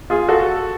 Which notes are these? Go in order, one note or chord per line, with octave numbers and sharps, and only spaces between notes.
F4 G#4
F#4 A4